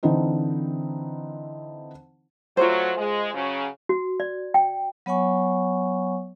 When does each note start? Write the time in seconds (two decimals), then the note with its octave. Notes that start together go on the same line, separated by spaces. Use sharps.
0.03 D3 E3 C4 D#4 C5
2.57 F#3 A3 F4 C5
2.97 G#3
3.34 C#3 F#3 C#4
3.89 F#4
4.20 D5
4.54 G5
5.06 F#3 B3 C#5 F#5 G#5 C#6